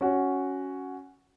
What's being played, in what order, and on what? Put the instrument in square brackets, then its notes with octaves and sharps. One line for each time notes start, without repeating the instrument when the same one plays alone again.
[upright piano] C#4 F#4